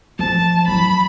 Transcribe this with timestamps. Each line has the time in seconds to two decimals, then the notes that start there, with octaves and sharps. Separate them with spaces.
0.19 F3 A5
0.68 F#3 E4 B5